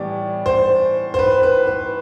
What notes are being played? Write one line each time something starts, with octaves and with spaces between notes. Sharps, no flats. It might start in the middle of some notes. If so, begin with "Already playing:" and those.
Already playing: A2 E3 G3 B3 D5
C5
C5
B4
B4
B4